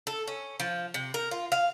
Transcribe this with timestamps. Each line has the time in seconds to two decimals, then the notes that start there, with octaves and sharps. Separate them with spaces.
0.07 A4
0.28 C#4
0.60 F3
0.94 C3
1.14 A#4
1.31 F4
1.52 F5